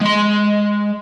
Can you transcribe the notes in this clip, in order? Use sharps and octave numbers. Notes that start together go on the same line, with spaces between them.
G#3 C6